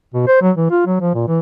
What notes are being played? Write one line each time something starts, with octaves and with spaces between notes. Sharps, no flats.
B2
C5
F#3
E3
F4
F#3
F3
A#2
E3